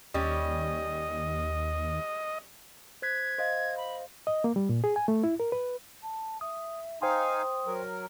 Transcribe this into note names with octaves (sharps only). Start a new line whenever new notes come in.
D#2 G3 C#4 D#5
C5 F#6 G#6 B6
C5 D#5 F5
B5
D#5
A#3
G3
A#2
G#4
G#5
A3
E4
A#4
B4
A5
E5 D#6
D#4 C5 F5 G5 G#5 C6 D#6
F#3 A#4